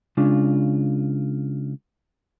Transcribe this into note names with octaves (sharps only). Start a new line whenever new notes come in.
C#3 G#3 D4 F4